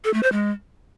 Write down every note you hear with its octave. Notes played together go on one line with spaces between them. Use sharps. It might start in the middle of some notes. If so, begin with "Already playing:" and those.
A4
A3
C5
G#3